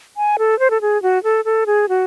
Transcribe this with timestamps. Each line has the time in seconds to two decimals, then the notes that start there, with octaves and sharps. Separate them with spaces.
0.17 G#5
0.39 A4
0.59 C5
0.71 A4
0.81 G#4
1.02 F#4
1.23 A4
1.45 A4
1.66 G#4
1.89 F#4